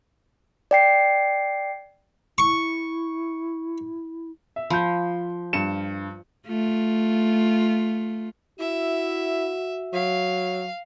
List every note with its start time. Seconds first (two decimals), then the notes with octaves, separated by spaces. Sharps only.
0.71 D5 G5 C7
2.38 E4 C#6
4.56 E5
4.70 F3 B5 G6
5.53 G2 C#7 E7
6.47 A3 F4
8.60 E4 F#4 E5
9.93 F#3 F5